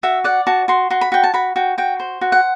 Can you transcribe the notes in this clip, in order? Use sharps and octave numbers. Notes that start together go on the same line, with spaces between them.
F#4 E5
D5 F#5
F#4 A5
F#4 C6
F#4 C6
B5
F#4 G5
A5
F#4 B5
F#4 G5
F#4 G5
C5
F#4
F#5